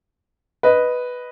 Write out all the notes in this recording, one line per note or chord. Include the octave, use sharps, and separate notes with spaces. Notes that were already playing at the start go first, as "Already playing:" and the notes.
B4 D#5